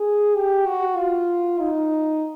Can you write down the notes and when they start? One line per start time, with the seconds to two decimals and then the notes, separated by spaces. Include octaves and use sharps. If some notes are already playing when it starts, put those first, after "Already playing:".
Already playing: G#4
0.35 G4
0.66 F#4
0.96 F4
1.59 D#4